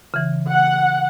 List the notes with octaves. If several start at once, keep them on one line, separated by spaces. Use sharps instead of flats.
C#3 E3
F#5